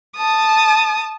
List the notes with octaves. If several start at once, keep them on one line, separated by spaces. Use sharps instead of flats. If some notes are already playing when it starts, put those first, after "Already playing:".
A5 D#6